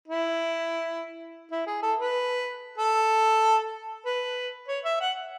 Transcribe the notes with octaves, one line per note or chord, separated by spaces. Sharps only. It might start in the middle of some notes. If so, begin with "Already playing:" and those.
E4
E4
G#4
A4
B4
A4
B4
C#5
E5
F#5